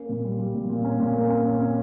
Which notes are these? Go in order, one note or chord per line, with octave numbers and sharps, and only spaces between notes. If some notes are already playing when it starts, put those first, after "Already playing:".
Already playing: A#3 C#4
A#2
G3
G3
A#2
A#2
C#4
A#2
A#3
C#4
C#4
C#4